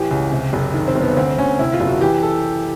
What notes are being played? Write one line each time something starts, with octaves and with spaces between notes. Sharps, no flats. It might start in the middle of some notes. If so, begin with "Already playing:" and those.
Already playing: A1 E3 G4
C#2
C3
F#1
D#3
C4
G1
B3
D2 C4
D2 C#4
C3 E4
F4
F#1
F#4
E3 G4
A4